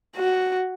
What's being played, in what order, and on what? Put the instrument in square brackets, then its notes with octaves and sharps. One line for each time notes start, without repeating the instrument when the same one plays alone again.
[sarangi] F#4